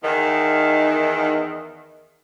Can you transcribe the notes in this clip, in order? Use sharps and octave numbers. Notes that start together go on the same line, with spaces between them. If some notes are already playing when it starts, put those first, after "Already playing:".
E2 D#3